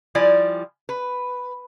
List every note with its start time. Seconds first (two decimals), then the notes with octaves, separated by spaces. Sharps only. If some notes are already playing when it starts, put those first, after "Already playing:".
0.15 F3 G3 E4 D5 G#5
0.89 B4